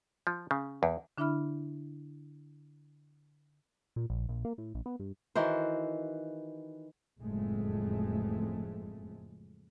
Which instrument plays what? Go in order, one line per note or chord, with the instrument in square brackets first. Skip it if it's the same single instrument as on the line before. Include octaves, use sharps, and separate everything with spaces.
[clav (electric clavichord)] F3
C#3
E2
[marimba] D3 D4 E4 E5 B5 F6
[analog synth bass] A#2
A#1
A#1
A#3
A2
A#1
B3
G2
[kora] D#3 E3 F#4 C5
[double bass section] F#1 F2 A2 G#3 A3